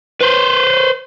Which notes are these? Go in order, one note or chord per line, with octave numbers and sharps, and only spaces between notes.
B4 C5